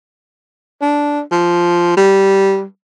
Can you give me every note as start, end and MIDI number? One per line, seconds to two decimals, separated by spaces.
0.81 1.20 62
1.31 1.95 53
1.97 2.64 55